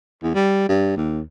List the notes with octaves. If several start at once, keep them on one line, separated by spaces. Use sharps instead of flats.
E2
G3
G2
D#2